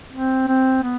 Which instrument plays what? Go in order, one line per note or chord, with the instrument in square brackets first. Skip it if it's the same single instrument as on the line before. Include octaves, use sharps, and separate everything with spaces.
[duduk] C4
C4
B3